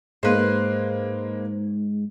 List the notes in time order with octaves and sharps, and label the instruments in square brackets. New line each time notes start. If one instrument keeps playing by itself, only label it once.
[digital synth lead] G#2 [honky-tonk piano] G#3 A#3 [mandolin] B4 C5